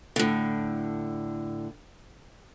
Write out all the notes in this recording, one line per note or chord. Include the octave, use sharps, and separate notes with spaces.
A2 D3